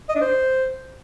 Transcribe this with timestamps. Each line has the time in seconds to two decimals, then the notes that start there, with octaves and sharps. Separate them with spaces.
0.09 D#5
0.15 D4
0.21 C5